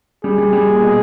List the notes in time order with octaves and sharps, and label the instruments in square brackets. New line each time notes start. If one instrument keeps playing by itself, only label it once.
[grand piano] G3 [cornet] G#4
[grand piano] G3
G3
A#2
B2